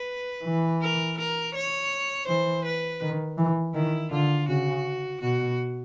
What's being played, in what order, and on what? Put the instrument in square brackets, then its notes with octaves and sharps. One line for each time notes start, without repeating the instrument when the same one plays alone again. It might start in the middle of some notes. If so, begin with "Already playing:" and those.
Already playing: [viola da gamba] B4
[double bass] E3
[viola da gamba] A#4
A#4
C#5
[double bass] E3 [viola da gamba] C5
[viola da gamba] B4
[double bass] D#3
E3
[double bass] D#3 [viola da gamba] E4
[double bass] D3 [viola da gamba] F4
[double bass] C#3 [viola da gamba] F#4
[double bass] B2 [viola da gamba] F#4